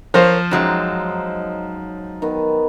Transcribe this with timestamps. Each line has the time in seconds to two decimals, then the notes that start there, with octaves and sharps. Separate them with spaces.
0.14 F3 A#4 C5 C#5
0.51 F#2 F#3 G#3 D#4 G5 A#5
2.22 D#3 B3